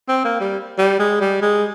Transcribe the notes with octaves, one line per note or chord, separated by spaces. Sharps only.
C4
A#3
G3
G3
G#3
G3
G#3